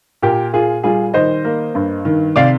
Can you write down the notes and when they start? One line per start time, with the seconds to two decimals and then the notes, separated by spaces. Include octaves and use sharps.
0.22 A#2 G4 A#4
0.53 A#2 F4 G#4
0.84 G3 F4 G#4
1.14 D#3 C5 D#5
1.45 A#3
1.75 G2
2.05 D#3
2.36 C3 D5 F5